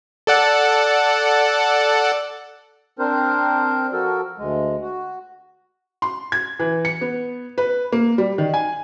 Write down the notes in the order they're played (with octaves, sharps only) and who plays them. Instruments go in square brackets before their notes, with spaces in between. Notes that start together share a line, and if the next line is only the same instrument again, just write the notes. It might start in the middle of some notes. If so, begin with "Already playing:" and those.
[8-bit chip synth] A4 D5 F#5
[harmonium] C4 D4 A#4 C5
F3 F#4 A4 A#4
D2 G#3
F#4
[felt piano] C6
G#6
E3
C#7
B3
B4
A#3
G3
D#3
G#5